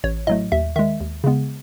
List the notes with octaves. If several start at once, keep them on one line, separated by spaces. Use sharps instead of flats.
A1 C#5
A2 F#3 A3 D#5
D#2 E5
D#3 G#3 E5
D#2
C#3 G#3 B3